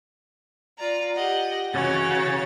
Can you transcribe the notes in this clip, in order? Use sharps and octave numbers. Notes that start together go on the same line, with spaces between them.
F4 D5 A#5
G4 D#5 F#5
C#3 E3 F#4 C#5 A6